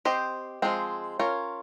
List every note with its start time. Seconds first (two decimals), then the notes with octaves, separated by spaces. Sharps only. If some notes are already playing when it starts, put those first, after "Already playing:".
0.05 C4 G4 C5 D#5
0.62 F3 G#3 C4
1.19 C#4 F4 A#4 C#5